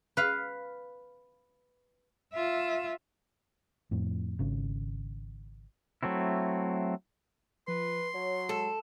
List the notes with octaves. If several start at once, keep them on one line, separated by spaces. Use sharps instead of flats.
B4 F5
F4 E5
F2 A2
G#1 C#3
F#3 A3 C4 E4
F3 B4 C6
F#3 C#5
G#3 A4